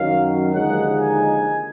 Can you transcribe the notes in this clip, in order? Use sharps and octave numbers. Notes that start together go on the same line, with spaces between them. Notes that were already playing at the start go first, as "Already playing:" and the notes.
Already playing: F#2 D#3 F#3 F5
D#2 D3 F3 G#3 D#4 F#5
G#5